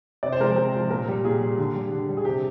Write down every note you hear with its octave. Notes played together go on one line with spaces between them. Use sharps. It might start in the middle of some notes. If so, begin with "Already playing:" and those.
C3 D5
C5
F3 G#3 A#4
C5
C3
F3 G#3
A#2 A#4
G3
A#2 G#4
G3
D3
G3
D3
G3
G#4
C3 G4